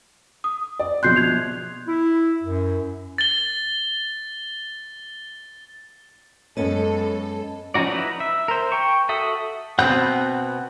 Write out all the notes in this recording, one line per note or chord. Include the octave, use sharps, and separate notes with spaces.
D#6
D5
A#1 B2 C6 F#6 G6 C7
G#6 F7
E4
F#2
A6 G7
F#2 G#3 B3 C#4 A4 D#5 A5
F3 C#4 D#4 F#4 D5
D#4 E4 B4
E5
A#4 C5
G5 C#6
F#4 A4 E5 D#6
B2 B3 C4 F#5 F#6 G6